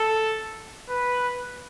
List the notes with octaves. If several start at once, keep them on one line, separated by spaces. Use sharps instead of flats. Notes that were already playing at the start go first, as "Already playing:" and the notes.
Already playing: A4
B4